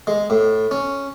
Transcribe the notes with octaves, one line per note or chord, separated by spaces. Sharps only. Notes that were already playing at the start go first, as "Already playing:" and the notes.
G#3
A2
C#4